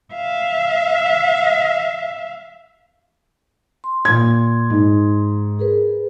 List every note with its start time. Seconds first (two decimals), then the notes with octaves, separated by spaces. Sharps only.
0.14 E5 F5
3.84 C6
4.05 A#2 G#6
4.70 G#2
5.59 G#4 A#4 B4